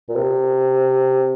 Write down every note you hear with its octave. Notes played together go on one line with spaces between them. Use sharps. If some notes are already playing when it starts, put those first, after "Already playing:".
A#2
C3